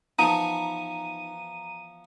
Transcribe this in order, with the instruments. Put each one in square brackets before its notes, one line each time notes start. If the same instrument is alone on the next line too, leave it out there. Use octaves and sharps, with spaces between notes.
[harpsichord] E3 F3 B3 [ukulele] D#4 A5 [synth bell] A#5 [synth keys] D#7